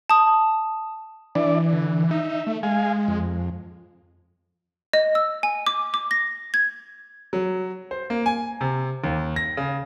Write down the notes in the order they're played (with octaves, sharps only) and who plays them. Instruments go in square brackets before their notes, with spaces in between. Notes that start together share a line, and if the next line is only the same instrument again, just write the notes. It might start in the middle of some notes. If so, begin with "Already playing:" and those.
[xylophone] A5 D#6
[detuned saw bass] E3 [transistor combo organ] D4 E4 D5
[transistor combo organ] D3
[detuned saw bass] D#4 [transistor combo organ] E5
[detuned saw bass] A3
[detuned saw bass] G#3 [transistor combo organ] F5 G#5
[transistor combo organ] F2
[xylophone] D#5
E6
G#5
D6
D6
A#6
G#6
[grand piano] F#3
C5
A#3
G#5
C3
D#2
A#6
C#3